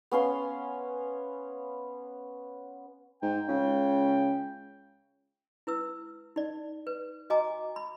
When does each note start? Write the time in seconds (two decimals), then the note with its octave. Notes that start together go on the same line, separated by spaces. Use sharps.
0.11 B3 C#4 F5 C6
3.23 G#2 G5
3.48 C#2 C#3
5.67 E4 B4 E6
6.36 D#4 D5
6.87 B4
7.30 F#4 D#5 G#5 A#5 D6
7.76 B5